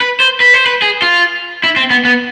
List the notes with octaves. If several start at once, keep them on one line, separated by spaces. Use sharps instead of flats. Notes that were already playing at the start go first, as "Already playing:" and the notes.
B4
C5
B4
C5
B4
G#4
F4
E4
C4
B3
B3